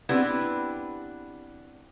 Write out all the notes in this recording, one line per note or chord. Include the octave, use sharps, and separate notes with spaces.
B3 C4 D4 E4 G4 B4